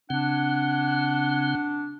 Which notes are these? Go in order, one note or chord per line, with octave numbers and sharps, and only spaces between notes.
C#3 C4 D4 F#5